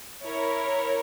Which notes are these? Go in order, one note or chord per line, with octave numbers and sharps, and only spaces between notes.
E4 A#4 C#5